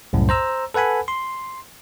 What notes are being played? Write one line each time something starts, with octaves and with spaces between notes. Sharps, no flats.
C2 F#2 A2
C5 A#5 E6
A4 B4 F#5 G#5 B5
C6